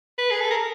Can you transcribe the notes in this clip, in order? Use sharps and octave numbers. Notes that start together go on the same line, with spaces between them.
B4
G#4
A4
A#4